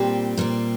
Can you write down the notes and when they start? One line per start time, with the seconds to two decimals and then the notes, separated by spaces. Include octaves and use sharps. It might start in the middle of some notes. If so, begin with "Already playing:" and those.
Already playing: A#2 G3 C4 G4
0.38 A#2 G3 C4